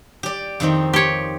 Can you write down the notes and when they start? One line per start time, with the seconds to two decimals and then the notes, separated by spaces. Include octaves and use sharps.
0.23 G4 D5
0.60 F2 D#3 C4
0.93 G4 C#5